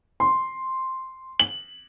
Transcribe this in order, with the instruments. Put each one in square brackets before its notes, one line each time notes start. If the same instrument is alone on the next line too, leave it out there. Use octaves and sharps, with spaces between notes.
[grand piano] C6
F#7